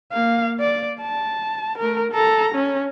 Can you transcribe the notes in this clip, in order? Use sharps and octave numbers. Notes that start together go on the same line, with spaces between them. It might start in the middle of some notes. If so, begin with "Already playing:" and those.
A#3 F5
D5
A5
A3 A#4
A4 A#5
C#4